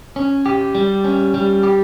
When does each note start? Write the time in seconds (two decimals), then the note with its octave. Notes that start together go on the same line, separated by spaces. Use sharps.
0.16 C#4
0.46 G4
0.75 G3
1.04 C#4
1.34 G3
1.63 G4